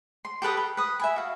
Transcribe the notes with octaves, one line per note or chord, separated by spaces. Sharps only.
C6
G4 A4 B4 D#6
B5
B4 D#6
E5 G#5 B5
F#4 F5